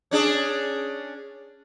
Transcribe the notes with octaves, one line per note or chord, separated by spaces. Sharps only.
C#4 D4 G#4